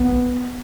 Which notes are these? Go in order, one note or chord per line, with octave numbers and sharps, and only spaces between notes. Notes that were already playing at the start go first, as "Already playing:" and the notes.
Already playing: B3